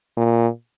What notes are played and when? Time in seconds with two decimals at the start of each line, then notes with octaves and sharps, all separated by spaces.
0.17 A#2